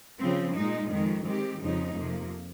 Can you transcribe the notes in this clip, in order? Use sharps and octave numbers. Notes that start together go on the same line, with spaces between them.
C#3 F3 C4
A#2 G#3 D#4
F2 D#3 G#3
D#3 G#3 C4 G4
F2 C#3 F3 G#3 D#4
F2 C3 F3 A#3